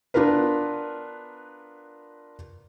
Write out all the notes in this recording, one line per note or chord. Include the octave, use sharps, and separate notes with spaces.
B3 D4 F4 A#4 B4